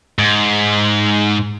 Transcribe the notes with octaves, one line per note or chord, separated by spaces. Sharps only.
G#2